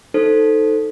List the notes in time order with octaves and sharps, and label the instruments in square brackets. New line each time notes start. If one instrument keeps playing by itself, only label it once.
[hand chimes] D#4 A4 C5